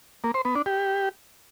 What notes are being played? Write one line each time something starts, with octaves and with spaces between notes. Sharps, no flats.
A#3
C5
B3
D4
G4